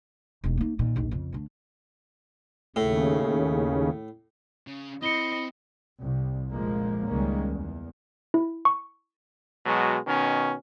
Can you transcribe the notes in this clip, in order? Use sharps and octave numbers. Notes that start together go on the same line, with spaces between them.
E1 D#2
A#3 D#4
A#2 D#3
A#1 D#2
F2 C#3
D2 D3
D#2 A2 C#3
C#3
C4 E4 D#5 C#7 G7
C2
F1 A#1 F3 G#3 A#3
C#2 D#3 G3 G#3 A#3 C#4
E2
E4
C#6
B2 F#3 G#3
B2 D#3 C#4